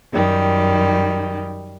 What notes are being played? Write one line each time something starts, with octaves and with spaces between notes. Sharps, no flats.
F#2 D#3 G3